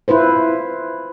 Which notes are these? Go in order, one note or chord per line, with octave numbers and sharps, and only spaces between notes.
E4 F4 B4 C5